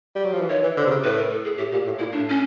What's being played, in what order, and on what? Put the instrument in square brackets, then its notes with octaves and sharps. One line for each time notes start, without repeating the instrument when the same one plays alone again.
[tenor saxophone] G3
F#3
F3
E3
[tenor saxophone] D#3 [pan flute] C#5
[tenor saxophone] E3
[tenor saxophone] D3 [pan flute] C5
[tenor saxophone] C3
C#3
[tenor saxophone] A2 [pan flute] B4
[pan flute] A#4
A4
G#4
[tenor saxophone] A2 [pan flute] G4
[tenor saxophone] A#2 [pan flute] G4
[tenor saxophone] A2
[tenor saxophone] A#2 [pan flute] E4
[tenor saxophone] A2 [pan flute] D4
[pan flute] C#4